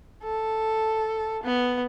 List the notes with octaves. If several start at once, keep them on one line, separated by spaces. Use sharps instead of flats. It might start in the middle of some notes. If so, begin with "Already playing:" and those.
A4
B3